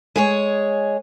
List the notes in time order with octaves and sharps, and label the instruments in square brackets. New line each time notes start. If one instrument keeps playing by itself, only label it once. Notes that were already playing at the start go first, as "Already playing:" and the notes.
[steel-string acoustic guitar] G#3 G#4 C#5